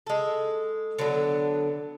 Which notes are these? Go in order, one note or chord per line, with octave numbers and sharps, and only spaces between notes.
G#3 A4
D3 F#3 B3 D4